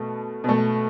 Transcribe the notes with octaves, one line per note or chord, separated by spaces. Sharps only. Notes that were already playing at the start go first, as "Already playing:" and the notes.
Already playing: B2 A3
B2 A3